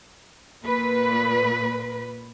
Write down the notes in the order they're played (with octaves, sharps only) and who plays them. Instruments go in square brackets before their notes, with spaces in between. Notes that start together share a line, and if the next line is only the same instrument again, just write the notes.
[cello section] A#2 B4